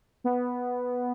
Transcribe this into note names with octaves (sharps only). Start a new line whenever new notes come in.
B3